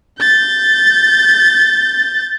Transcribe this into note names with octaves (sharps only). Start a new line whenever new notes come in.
G6 A6